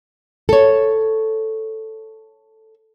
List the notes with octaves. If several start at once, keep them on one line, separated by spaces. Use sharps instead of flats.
A4 C#5